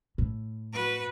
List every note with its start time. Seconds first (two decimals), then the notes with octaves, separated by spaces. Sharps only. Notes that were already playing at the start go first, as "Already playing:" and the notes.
0.18 A2
0.73 F#4 B4